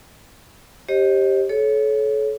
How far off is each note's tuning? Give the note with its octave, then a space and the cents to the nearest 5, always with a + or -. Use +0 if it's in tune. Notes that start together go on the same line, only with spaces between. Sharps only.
G4 +0 C5 +45 D#5 +0
A4 -30 C#5 +0